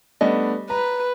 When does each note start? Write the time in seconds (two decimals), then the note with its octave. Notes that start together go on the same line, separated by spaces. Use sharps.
0.21 G3 A3 B3 C#4 D4 D#5
0.70 B4 A#5